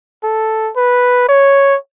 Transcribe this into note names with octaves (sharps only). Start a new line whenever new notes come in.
A4
B4
C#5